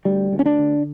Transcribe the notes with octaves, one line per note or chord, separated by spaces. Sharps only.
D2 G3
D2
C#4
D4
D3